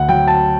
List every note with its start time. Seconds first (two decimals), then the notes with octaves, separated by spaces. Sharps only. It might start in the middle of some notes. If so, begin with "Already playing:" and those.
Already playing: D2 F#5
0.09 F#3 G5
0.27 A5